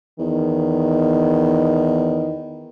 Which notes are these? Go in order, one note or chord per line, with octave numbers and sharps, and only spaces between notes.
E2 D#3